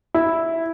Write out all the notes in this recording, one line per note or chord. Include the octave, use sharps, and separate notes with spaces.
E4